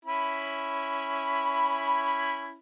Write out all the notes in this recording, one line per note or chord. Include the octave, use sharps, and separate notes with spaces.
C#4 E4 B5